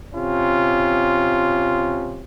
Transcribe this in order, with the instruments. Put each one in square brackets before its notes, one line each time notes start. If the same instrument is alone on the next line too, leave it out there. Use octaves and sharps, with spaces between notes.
[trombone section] C3 C#4 F4